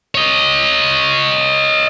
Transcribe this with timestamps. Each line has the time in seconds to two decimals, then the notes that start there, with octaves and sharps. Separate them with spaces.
0.15 C#5 D#5